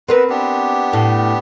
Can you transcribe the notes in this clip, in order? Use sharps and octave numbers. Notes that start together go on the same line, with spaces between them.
B3 C4 A#4 B4 F#5
B3 D4 G4
A2